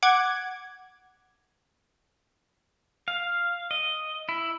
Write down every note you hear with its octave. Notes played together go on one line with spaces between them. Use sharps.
F#5 D6 G#6
F5
D#5
E4